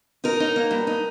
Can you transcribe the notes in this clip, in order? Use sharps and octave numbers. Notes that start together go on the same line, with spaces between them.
D#4 A#4
D#4
A#3
G2
D#4